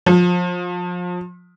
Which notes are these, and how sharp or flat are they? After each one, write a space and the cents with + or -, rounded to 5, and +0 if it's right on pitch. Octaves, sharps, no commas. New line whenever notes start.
F3 +25